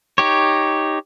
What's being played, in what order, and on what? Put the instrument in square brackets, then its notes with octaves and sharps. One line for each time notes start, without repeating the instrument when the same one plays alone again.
[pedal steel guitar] D#4 G4 C#5